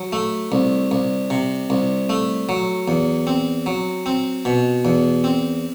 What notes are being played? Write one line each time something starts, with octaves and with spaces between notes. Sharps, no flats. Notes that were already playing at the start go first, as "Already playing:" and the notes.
Already playing: F#3
A3
C2
C2
C3
C2
A3
F#3
E2
C4
F#3
C4
B2
E2
C4